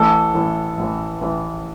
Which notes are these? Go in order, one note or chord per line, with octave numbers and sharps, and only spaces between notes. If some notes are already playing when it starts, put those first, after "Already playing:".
Already playing: A1 A2 E3 A4
A1 A2 E3
A1 A2 E3
A1 A2 E3